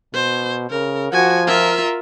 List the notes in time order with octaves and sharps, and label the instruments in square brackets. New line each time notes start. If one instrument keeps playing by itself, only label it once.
[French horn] B2 [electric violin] C5
[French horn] C#3 [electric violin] A#4
[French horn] F3 [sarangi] F#4 [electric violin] G#5
[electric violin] F4 E5 [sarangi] A#4